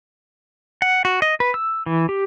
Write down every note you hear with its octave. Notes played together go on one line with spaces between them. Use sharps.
F#5
F#4
D#5
B4
E6
E3
G4